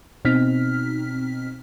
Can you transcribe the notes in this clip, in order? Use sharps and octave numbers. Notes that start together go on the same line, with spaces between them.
B2 C4 D#4 F6 B6